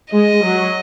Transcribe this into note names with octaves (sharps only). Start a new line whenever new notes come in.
G#3 D#5
F#3